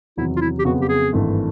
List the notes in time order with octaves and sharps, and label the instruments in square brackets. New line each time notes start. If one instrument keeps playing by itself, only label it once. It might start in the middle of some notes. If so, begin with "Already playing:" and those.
[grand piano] E2 C3 D#3 F#3 [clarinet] E4
[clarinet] F4
E4
G4
[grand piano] F2 C#3 F#3 B3 [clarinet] F#4
[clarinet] G4
G#4
[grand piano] G#1 G2 E3 A3